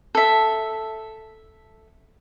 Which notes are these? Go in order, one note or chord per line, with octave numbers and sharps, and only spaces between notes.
A4 E5